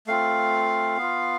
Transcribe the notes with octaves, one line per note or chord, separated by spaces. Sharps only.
A3 C4 F4 F5
B3 F4